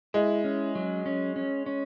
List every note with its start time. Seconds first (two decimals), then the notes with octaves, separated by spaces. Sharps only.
0.14 G#3 E4
0.44 C#4
0.75 F#3
1.06 C#4
1.36 C#4
1.66 C#4